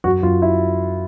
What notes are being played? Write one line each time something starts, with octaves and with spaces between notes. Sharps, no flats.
F#2 F#4
F#2 F4
E4